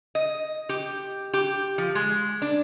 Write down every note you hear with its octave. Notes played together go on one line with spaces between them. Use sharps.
D#5
G4
G4
F3
G#3
D4